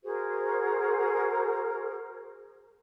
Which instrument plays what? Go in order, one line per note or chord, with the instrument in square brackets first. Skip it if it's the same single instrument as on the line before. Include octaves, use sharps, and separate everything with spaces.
[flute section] F#4 G#4 A#4 C5